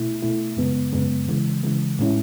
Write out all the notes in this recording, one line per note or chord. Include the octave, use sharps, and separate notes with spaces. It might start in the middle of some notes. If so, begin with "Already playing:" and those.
Already playing: B2 A3 E4
B2 A3 E4
F#2 C#3 G#3 B3
F#2 C#3 G#3 B3
C#3 E3 G#3
C#3 E3 G#3
A2 G#3 C#4 E4